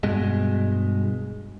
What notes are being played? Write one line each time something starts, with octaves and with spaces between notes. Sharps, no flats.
G2 B2 G#3